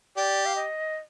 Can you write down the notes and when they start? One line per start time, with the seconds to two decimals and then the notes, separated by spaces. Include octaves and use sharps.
0.16 G4 D5
0.46 F5
0.56 D#5